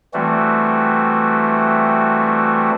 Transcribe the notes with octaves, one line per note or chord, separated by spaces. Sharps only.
E3 G3 A3 C4 F#4